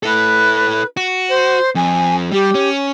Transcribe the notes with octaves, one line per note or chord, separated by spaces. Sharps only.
E4 A4 B4
F#4
C5
F2 G#5
G3 G4
C#4